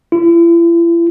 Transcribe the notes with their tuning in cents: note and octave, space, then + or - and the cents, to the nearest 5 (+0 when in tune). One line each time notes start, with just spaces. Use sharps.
E4 +40